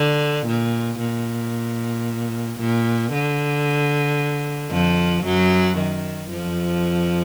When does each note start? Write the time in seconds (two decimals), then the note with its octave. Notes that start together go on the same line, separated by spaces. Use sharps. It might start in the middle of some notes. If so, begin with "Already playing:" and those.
Already playing: D3
0.47 A#2
1.00 A#2
2.60 A#2
3.12 D3
4.71 F2 F3
5.24 F#2 F#3
5.78 D#3
6.31 F2 F3